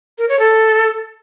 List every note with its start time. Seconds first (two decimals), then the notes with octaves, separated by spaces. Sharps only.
0.18 A#4
0.29 C#5
0.39 A4